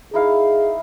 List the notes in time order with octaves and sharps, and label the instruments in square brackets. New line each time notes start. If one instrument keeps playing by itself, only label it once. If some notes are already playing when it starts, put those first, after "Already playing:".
[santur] D#4 E4 F5 [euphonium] G#4